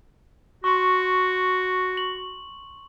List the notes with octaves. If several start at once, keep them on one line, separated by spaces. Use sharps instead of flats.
F#4 C6 C#6
F#7